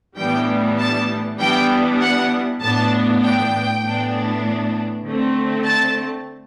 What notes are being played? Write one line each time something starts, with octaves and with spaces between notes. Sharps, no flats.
A2 E3 G3 B3 D4 G5
A5
E3 G3 B3 D4 G5
F#5
A2 E3 B3 D4 A5
G5
A2 E3 B3 D4
D3 A3 C4
A5